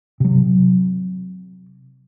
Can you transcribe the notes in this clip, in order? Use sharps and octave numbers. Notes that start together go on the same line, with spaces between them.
C3 F#3